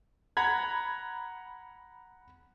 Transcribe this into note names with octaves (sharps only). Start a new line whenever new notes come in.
F#5 A#5 B5 G#6